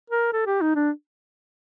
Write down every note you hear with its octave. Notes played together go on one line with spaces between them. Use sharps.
A#4
A4
G4
D#4
D4